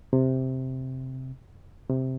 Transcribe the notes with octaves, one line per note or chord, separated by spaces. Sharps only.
C3
C3